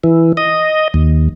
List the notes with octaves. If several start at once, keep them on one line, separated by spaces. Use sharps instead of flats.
E3
D#5
D#2